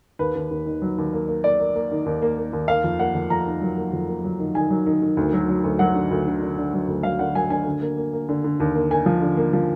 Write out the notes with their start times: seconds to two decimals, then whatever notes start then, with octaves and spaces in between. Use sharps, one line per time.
0.19 D#2 B4
0.35 D#2
0.51 D#2
0.66 D#3
0.82 F#3
0.98 D#2
1.13 A#3
1.28 A#3
1.44 A#3 D5
1.59 A#3
1.75 A#3
1.91 D#3
2.06 D#2
2.22 A#3
2.38 A#3
2.53 D#2
2.68 A#3 F5
2.84 F2
2.99 A#3 F#5
3.15 F2
3.30 F2 A#5
3.46 D#3
3.62 F#3
3.77 A#3
3.93 F2
4.09 A#3
4.24 F#3
4.39 D#3
4.55 D#3 G#5
4.71 F#3
4.86 D#3
5.02 D#3
5.17 D2
5.33 F#3
5.49 F#3
5.64 D2
5.79 F#3 F#5
5.95 D3
6.11 D2
6.27 D3
6.42 D3
6.58 D3
6.73 F#3
6.88 D2
7.03 F#3 F5
7.19 D3 F#5
7.35 F#3 G#5
7.50 D3 G#5
7.66 D3
7.82 A#3
7.97 A#3
8.13 A#3
8.29 D3
8.44 D3
8.60 D#2
8.75 A#3
8.91 A#3 G#5
9.06 F3
9.22 D3
9.37 A#3
9.53 F3